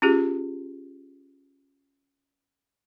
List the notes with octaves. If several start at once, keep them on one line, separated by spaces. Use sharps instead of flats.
C#4 F4 G4 G#4